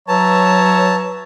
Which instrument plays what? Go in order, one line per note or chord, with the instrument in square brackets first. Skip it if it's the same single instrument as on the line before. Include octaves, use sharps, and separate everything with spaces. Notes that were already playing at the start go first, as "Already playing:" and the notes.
[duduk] F#3 [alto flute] B4 [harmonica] C#5 E5 A#5 [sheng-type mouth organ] A5